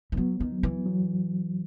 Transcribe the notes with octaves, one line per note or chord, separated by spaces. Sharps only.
E3
F#3 B3
D#3
F#3
E3
F#3